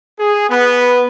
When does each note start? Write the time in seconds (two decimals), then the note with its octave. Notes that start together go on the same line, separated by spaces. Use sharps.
0.19 G#4
0.49 B3